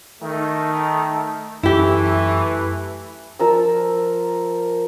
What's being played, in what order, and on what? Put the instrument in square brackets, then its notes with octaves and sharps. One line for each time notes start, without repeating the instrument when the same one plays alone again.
[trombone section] D#3 A3
[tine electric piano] F#2 [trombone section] E3 A3 [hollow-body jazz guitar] E4 G4
[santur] F3 A#4 D5 E6